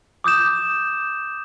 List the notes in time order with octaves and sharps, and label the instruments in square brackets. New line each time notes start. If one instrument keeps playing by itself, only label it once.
[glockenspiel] D6 D#6 G6 E7